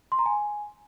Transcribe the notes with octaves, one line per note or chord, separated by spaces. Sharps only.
C6
A#5
G#5